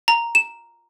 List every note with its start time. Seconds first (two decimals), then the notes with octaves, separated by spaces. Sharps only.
0.08 A#5
0.35 E7